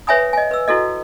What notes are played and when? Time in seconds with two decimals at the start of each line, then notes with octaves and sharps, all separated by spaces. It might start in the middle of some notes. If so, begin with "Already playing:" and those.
0.07 B4 C#5 E5 G#5 B5 D#6
0.33 D#5 G#5
0.51 B4 E6
0.68 E4 F#4 A4 D#5